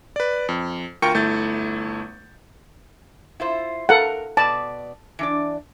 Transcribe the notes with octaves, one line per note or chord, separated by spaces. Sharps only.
B4 D5
F2
D2 F4 A#4 G5 C#6 C#7
G1 A3 E4 G6 A6
E4 F4 C5
A4 A#4 F5 F#5
B2 B4 D5 A5
E3 D4 D5